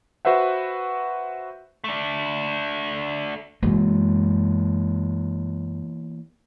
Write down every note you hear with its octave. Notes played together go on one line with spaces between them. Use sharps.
F#4 B4 C5 E5 F#5
A3 D4
F#2 B2 E3 G#3 A#3